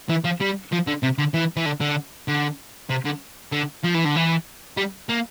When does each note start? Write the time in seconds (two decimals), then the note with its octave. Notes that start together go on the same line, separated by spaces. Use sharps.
0.09 E3
0.24 F3
0.40 G3
0.72 F3
0.87 D3
1.03 C3
1.18 D3
1.34 E3
1.56 E3
1.65 D3
1.81 D3
2.28 D3
2.90 C3
3.05 D3
3.52 D3
3.84 F3
3.95 E3
4.05 D3
4.16 E3
4.77 G3
5.09 A#3